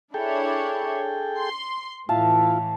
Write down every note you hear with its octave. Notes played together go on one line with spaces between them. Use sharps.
D4 E4 G#4 A4 C#5 G5
C6
A2 E3 E4 F4 E5 F5 A5